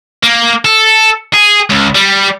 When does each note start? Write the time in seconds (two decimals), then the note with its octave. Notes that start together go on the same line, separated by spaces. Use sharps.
0.23 A#3
0.65 A4
1.33 G#4
1.70 C#2
1.95 G3